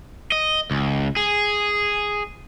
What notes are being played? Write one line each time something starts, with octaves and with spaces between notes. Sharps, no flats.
D#5
C#2
G#4